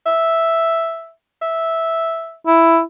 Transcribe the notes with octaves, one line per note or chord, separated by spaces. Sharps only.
E5
E5
E4